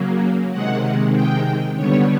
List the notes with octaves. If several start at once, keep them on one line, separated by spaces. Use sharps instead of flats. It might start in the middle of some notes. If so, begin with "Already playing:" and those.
Already playing: C#3 F#3 A#3
C3 D#3 G#3 F#5
G5
D3 G3 B3 C#5